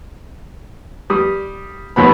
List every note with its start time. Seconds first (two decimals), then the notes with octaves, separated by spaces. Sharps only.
1.10 G3 D#6
1.96 D#2 B2 B3 B5